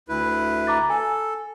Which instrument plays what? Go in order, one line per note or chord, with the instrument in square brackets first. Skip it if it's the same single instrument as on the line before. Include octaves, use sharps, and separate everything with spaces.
[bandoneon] D2 E4 B4
[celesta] A#5 D6 A6
[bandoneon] A4 [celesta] G#5